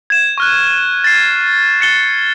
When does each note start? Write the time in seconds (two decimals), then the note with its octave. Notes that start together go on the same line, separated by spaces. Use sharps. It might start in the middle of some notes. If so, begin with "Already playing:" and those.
0.10 G#6 E7
0.38 C#6 F6 F#6
1.04 A6 C7
1.81 A6 C#7 G7